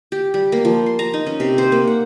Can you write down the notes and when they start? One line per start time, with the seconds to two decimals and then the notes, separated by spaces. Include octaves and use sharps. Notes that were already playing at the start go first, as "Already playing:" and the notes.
0.12 G4
0.34 G3
0.52 A#3
0.65 F3
0.86 C6
0.99 A#5
1.14 D#4
1.26 C#4
1.40 C3
1.58 C5
1.72 A#3
1.87 F#5